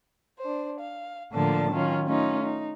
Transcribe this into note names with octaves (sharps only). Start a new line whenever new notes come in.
D4 C5
F5
A2 D3 F3 A#3 D4 A5
D#3 F#3 C#4 F4
A3 C#4 D#4 F4
D#4